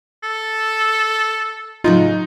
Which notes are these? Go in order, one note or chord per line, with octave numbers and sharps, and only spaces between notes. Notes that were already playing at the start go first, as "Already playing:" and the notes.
A4
A2 C#3 F#3 D#4 F4